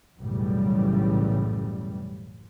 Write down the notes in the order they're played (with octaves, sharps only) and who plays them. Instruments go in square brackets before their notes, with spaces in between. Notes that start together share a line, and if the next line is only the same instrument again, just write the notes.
[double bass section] B1 F#2 A2 C#3 E3 G3